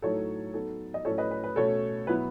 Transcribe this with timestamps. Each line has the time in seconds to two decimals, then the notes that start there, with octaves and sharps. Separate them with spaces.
0.02 A2 F#3 A3 D#4 A4 C#5
0.54 F#3 B3 D#4 A4
0.94 D#5
1.05 A2 F#3 A3 C#4 A4 C#5
1.18 B4 D#5
1.31 B4
1.44 B4
1.56 B2 A3 C#4 A4 C#5
2.07 B2 F#3 B3 E4 B4